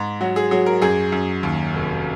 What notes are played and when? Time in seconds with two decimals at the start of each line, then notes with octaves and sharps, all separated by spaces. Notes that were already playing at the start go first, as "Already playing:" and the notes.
Already playing: G#2
0.21 F#3 F#4
0.36 G#4
0.51 F#3 G#4
0.66 A#4
0.82 F#2 G#4
1.12 F#2
1.43 D#2
1.73 F1